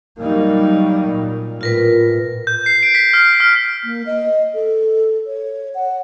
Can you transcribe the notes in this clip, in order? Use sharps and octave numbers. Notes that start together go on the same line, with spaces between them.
F#3 G3 A#3 D#4
A#2
A2 F4 A#4 B4
G6
C7
D7
B6
F6
F6
A#3
D#5
A4
C#5
F#5